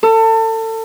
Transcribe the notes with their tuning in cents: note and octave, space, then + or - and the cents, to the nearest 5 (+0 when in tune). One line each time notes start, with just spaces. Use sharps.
A4 +30